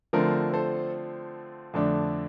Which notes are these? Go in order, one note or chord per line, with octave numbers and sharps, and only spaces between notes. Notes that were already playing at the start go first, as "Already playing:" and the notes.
D3 F3 A3 C4 A#4
A4 C5
F2 D3 A3 D4